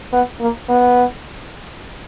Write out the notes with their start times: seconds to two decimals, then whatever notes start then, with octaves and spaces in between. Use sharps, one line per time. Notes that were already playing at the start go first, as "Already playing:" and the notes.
0.13 B3
0.41 A#3
0.69 B3